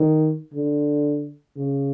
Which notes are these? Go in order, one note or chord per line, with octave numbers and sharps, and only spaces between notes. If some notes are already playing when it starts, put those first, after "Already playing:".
Already playing: D#3
D3
C#3